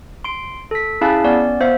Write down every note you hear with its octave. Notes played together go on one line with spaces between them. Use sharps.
C6 D7
A4 B6
C#4 E4 G#4 E5 F5 A5
B3 C#4 D5
B3 C5 E5 F5